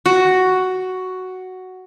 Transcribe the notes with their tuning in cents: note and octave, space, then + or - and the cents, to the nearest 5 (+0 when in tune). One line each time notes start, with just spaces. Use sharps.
F#4 +5